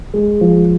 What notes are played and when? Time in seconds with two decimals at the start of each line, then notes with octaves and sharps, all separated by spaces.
0.14 G#3
0.41 F3